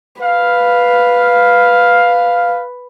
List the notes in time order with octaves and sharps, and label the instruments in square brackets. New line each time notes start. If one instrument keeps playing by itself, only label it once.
[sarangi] B4 [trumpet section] F5